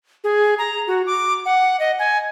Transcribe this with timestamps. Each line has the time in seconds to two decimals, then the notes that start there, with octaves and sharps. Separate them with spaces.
0.24 G#4
0.58 A#5
0.87 F#4
1.06 D6
1.46 F#5
1.80 D#5
1.99 G#5